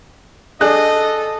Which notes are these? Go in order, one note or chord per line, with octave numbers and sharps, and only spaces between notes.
D4 G#4 A4 D#5 F#6